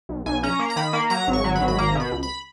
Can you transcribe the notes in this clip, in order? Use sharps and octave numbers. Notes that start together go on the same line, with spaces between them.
B1
B1 G#5
C#4 A#5
A#3
A#5
D#3 B5
A#3
F#3 A#5
G#1
C#6
F#3
B5
G#1
B5
A#3 A#5
B2 B5
C#2
B5